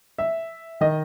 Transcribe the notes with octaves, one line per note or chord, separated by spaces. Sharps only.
E5
D#3 D#5